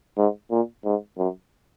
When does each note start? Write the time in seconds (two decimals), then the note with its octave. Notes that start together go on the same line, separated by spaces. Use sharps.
0.17 G#2
0.51 A#2
0.85 G#2
1.18 F#2